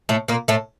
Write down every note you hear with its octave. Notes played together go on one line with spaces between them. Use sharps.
A2 A3
A#2 A#3
A2 A3